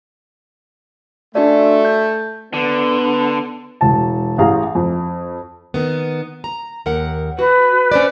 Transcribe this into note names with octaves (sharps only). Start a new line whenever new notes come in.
A3 D4 F#4 D5
G6
D3 B3
E1 A5
A1 G#4 F5 A#5
F2
D#3 B3
A#5
D#2 A#4 F#5
F#4 B4
C#4 C5 D5